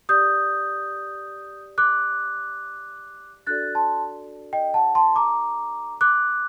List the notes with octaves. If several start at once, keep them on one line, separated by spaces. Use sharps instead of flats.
G4 D5 D#6 G6
D6 F#6
D4 F#4 A4 D5 F#6 A6
A5 C6
D#5 G5
F#5 A5
A5 C6
A#5 D6
D6 F#6